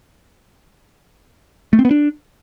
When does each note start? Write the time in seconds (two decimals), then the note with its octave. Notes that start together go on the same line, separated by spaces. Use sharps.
1.73 A3
1.79 C4
1.85 B3
1.91 D4